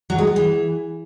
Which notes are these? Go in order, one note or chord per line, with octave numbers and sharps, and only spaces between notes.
F#3
G#3
B3
E3